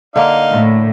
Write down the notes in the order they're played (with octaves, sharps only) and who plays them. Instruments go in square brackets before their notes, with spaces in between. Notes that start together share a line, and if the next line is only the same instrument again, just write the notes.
[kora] D3 A#3 [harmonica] D#4 F5
[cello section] A2